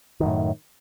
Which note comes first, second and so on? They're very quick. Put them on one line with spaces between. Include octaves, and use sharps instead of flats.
D#3 F#2 A2